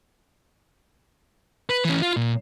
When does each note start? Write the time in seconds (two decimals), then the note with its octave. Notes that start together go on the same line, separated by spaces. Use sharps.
1.70 B4
1.85 E3 C#4
2.02 F4
2.17 A#2